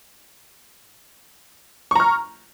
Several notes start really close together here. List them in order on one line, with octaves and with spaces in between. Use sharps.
C#6 A#5 F6